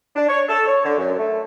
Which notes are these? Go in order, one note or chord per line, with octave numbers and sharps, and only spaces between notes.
D4
C#5
A4
C#5
D3
F#2
A3